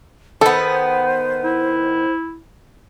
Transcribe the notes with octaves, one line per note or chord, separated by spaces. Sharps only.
D#3 B3 A4 C5
E4